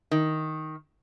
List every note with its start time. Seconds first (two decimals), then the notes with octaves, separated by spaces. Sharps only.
0.11 D#3